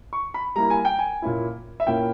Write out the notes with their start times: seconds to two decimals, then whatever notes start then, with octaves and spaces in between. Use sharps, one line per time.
0.13 C#6
0.34 B5
0.56 G3 A#3 E4 A#5
0.70 G#5
0.85 G5
0.99 G#5
1.22 A#2 A#3 C#4 E4
1.80 E5
1.86 A#2 A#3 C#4 E4 G5